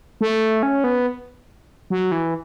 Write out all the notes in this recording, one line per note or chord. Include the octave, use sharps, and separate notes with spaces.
A3
C#4
B3
F#3
E3